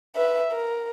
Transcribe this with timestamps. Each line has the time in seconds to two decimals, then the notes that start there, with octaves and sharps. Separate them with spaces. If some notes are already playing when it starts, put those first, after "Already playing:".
0.16 B4 E5
0.52 A#4